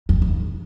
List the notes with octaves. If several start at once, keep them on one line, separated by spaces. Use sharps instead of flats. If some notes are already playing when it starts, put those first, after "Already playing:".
F2
F2